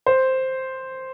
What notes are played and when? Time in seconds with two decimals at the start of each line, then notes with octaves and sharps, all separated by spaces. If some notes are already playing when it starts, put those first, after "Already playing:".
0.06 C5